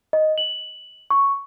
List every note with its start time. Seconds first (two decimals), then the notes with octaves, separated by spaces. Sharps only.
0.13 D#5
0.38 F#7
1.10 C#6